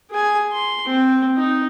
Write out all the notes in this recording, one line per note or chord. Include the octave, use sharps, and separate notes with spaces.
G#4 G#5
C6
C4
D#4